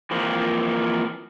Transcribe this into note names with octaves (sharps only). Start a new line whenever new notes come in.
E3 F3 A#3 C4